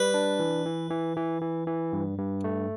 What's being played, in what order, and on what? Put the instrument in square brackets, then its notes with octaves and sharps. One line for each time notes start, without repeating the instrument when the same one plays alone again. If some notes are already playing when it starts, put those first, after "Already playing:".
Already playing: [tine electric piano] G3 [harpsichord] B4
[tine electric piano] D4
E3
E3
E3
E3
E3
E3
G2
G2
A3